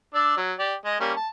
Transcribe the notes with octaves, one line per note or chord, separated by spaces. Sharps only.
D4 D5 E6
F#3
G4 D5
G#3 D#5
G3 A#3 C#4
A5